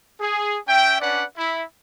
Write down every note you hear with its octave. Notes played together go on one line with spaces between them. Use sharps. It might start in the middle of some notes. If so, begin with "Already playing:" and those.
G#4
C#4 E5 G5
C#4 D4 B4 D5 F#5
E4